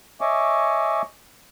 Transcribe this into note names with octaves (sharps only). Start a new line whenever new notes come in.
C#5 D#5 E5 G#5 C#6 D6